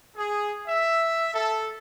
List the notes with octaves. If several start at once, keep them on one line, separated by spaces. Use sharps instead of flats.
G#4
E5
A4